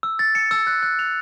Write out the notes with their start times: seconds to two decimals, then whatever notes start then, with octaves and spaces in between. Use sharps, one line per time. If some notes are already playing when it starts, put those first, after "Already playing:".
0.03 E6
0.19 A6
0.35 C#7
0.51 E6
0.67 F#6
0.83 F#6
0.99 F7